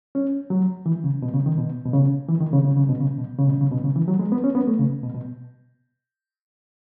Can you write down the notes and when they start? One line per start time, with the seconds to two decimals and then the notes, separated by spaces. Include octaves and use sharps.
0.15 C#4
0.50 F#3
0.86 E3
1.04 C#3
1.22 B2
1.34 C#3
1.46 D#3
1.58 B2
1.85 B2
1.93 C#3
2.29 E3
2.40 D#3
2.53 C#3
2.65 C#3
2.77 C#3
2.89 B2
3.01 C#3
3.18 B2
3.38 C#3
3.48 B2
3.61 C#3
3.71 B2
3.84 C#3
3.96 E3
4.08 F#3
4.19 G#3
4.32 B3
4.44 C#4
4.55 B3
4.67 A3
4.79 C#3
5.04 B2
5.14 B2